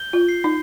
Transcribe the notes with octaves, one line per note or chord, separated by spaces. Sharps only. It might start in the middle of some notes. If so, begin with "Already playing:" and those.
Already playing: G6 G7
F4
C7
D#4